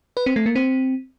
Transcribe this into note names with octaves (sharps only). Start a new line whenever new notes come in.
B4
C4
A3
A#3
C4